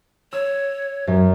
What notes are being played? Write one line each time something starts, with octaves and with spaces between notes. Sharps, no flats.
C#5 E6
F#2